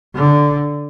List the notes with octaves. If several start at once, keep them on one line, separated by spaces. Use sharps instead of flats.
D3